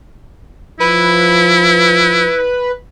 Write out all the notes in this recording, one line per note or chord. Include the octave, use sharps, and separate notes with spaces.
F3 E4 B4